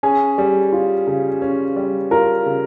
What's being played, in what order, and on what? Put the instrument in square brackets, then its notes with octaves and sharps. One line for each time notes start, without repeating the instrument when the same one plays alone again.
[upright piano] C#4 [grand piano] G#4
[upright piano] G3
F4
C#3
C#4
G3
[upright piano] F4 [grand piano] A#4
[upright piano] C#3